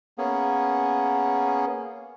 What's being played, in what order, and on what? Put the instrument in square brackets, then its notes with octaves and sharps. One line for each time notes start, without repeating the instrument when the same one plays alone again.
[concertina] A#3 B3 C#4 G#4